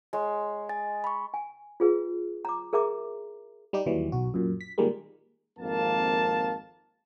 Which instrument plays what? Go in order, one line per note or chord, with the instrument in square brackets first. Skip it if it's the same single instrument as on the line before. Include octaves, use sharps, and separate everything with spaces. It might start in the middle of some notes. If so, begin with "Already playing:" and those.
[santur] G#3 [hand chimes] C#5
[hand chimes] D#5 G#5 A6
B5 C#6
[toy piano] G#5
F4 G#4 B4
A#5 D6
G#4 A#4 E5 A#5 D6
[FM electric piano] G3 D#4 G4
D#2 E3 F#3 G3
B1 F#4
F#2 A#2
B6
A#2 D#3 G3 G#3 A#3
[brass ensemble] G#1 F2 A#3 F5 A5